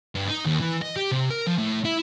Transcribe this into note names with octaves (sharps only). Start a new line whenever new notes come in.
G2
D#4
D#2
E3
D#5
G4
C3
A#4
F3
A2
E4